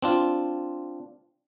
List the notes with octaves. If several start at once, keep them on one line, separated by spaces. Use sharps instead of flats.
C4 D4 F4